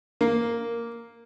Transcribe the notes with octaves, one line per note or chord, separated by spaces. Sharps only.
A#3